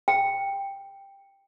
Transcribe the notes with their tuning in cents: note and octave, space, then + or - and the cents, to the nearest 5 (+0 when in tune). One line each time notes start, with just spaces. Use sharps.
G5 +5